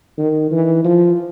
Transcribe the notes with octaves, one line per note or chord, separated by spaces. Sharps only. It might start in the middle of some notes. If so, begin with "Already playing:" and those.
D#3
E3
F3